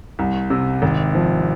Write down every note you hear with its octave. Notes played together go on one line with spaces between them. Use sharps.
C2
C3
G#1
F3